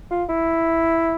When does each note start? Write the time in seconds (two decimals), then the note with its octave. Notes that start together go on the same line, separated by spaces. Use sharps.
0.11 F4
0.29 E4